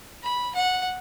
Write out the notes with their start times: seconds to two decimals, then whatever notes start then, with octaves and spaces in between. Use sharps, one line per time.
0.23 B5
0.55 F#5